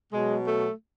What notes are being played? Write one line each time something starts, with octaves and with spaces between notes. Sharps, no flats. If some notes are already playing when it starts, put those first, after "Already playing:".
B2 F#3 G#3
A3